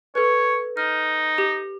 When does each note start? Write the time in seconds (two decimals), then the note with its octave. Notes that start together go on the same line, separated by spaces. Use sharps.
0.15 A4 B4 C#5
0.77 D#4 F6
1.38 G4